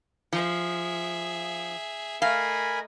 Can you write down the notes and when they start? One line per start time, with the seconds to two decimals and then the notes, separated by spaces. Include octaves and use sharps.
0.33 F3 G#4 E5
2.22 A3 A#4 D#5 F5 G#5 B5